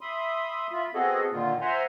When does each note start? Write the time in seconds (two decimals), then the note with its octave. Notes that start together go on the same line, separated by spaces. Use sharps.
0.01 E5 B5 C6 D#6
0.72 F4 E5 B5
0.94 B3 C4 F#4 G#4 A4 D#5
1.32 A#2 D3 D#3 A#3 F4
1.61 C5 E5 F#5 G#5 A#5 C6